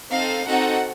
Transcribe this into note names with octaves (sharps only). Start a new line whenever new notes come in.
C4 D#4 A4 F5
C4 D#4 F#4 A4 F#5